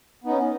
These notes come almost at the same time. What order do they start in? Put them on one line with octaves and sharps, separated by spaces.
B3 D#4 C#4